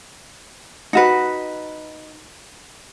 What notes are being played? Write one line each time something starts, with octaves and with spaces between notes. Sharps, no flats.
D#4 F#4 B4